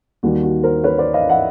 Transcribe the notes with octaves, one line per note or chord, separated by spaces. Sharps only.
D#2 D#3 G3 F#4
F#4
A#4 C5
B4 C#5
C5 D5
D#5 F5
E5 F#5